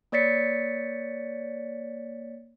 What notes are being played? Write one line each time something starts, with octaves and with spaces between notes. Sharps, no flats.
A#3 C#5 D5 A6 B6 C#7